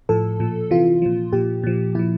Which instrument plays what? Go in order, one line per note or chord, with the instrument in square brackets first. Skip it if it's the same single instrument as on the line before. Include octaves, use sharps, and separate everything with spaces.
[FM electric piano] A2 F3 A4
A#2 F3
C3 E3 F4
A#2 F3
A#2 F3 G4
A#2 F3
A#2 F3 E4